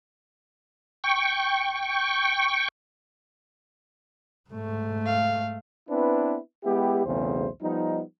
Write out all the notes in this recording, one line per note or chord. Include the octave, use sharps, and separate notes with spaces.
G5 C#6
G#2 A3
F5
B3 C4 D4 E4 B4
G#3 B3 E4 G4
B1 E2 C#3 A3 C4 C5
F3 G3 B3 D#4